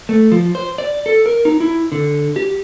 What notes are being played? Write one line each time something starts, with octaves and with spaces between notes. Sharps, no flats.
A3
F3
C5
D5
A4
A#4
D#4
E4
D3
G4